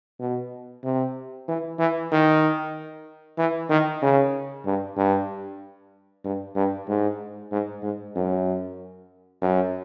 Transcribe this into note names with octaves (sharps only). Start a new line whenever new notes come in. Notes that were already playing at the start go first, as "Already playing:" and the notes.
B2
C3
E3
E3
D#3
E3
D#3
C#3
G2
G2
G2
G2
G#2
G#2
G#2
F#2
F#2